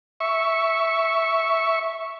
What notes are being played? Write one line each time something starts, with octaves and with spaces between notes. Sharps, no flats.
E5 C#6